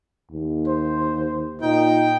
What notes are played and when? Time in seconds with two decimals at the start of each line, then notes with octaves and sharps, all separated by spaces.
0.31 D#2
0.67 C5
1.61 A#2 D#4 G5